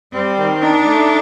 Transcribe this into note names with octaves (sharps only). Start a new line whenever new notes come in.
G3 C4
D#3
D4 D#4
A3